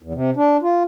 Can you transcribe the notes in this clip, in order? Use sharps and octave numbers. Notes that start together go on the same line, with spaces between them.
E2
C3
D4
F4